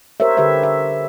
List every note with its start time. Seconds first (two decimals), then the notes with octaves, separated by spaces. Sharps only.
0.20 G4 A#4 C5 C#5 E5
0.37 D3 G4 A4 B4 E5
0.63 E5